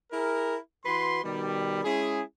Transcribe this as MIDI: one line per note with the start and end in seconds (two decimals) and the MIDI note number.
0.12 0.57 64
0.12 0.57 68
0.12 0.57 70
0.86 1.24 52
0.86 1.24 66
0.86 1.24 71
0.86 1.24 84
1.24 1.84 47
1.24 1.84 51
1.24 1.84 55
1.85 2.22 56
1.85 2.22 61
1.85 2.22 64
1.85 2.22 68